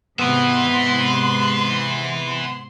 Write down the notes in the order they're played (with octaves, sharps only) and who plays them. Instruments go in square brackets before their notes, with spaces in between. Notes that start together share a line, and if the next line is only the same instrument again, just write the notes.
[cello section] G#2 C3 [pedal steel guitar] B3 [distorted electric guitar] B4 E5 [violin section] C6